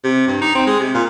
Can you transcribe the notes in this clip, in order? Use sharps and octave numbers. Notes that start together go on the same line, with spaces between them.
C3
G2
D#4
C4
G#3
C3
A#2